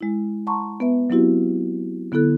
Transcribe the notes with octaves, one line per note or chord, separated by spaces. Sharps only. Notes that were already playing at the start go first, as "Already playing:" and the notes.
G#3 E4
F#5 A5 A#5 C6 C#6
B3 B4 E5
F#3 B3 C4 E4 F#4 G4
D3 B3 E4 A4 F#6